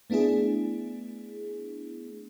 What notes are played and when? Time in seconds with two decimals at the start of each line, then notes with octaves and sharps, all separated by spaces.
0.10 A3 B3 D4 E4 G#4